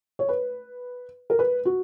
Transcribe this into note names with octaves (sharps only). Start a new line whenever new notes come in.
C#5
B4
A#4
B4
F#4